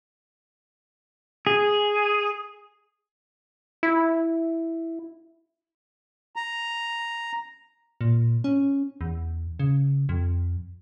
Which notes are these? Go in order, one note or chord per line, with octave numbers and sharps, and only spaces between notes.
G#4
E4
A#5
A#2
C#4
E2
C#3
F2